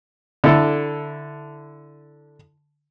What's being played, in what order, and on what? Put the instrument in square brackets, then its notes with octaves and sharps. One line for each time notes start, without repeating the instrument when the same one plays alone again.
[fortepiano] D3 E4 A4